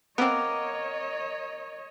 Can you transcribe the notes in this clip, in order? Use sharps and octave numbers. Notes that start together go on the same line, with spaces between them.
B3 C4 A#4 C#5 D#5 F5 F#5 D6